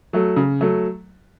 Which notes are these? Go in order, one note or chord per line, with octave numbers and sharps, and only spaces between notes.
F#3 A3
C#3
F#3 A3